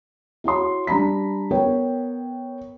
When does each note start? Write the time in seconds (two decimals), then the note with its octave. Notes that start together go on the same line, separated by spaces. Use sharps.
0.44 E4 F#4 C#5 C6
0.87 G3 D4 A#5 B5 B6
1.51 B3 A#4 B4 C#5 G5